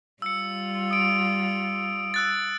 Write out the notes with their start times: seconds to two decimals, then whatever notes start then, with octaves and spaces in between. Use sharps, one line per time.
0.22 G3 F4 E6 C#7
0.91 D#6 D7
2.14 E6 F#6 A6